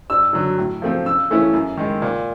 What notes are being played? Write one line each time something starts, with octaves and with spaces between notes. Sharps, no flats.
G2 E6
D3 F#3
A2
F3 A3 C4
C#3 E6
E3 A3 C#4 E4
F#2
D#3 G#3
A#2